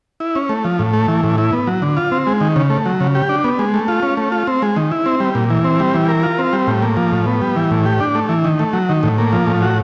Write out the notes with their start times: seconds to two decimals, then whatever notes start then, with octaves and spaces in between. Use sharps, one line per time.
0.20 E4
0.35 C#4
0.49 A3
0.64 F3
0.79 A2
0.93 A3
1.08 E3
1.23 A2
1.38 E4
1.53 B3
1.67 F#3
1.82 D3
1.97 F4
2.12 C4
2.27 G#3
2.41 D#3
2.56 C#3
2.70 A3
2.86 F#3
3.00 C#3
3.15 G4
3.29 D4
3.44 B3
3.59 G#3
3.74 A3
3.88 F4
4.03 C#4
4.17 A3
4.32 F4
4.47 C4
4.62 G#3
4.76 D#3
4.92 E4
5.06 C4
5.20 G3
5.35 A#2
5.50 E3
5.64 C4
5.80 G3
5.94 E3
6.08 A#4
6.23 F4
6.39 C4
6.53 G3
6.67 A2
6.82 A#3
6.97 F3
7.12 A2
7.26 B3
7.42 G3
7.56 E3
7.71 A2
7.86 G4
8.00 D4
8.15 A3
8.29 E3
8.44 D#3
8.59 A3
8.73 F#3
8.89 D#3
9.03 A2
9.18 A#3
9.33 F3
9.47 A2
9.62 F#4